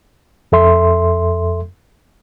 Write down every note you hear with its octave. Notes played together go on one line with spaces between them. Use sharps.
F2 A4 E5 C6